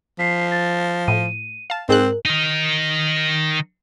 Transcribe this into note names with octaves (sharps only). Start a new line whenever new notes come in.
F3 B6 C7
A6
A2 D#7
F5 A5
G#2 C4 G#4 A#4 F#6
D#3 D#4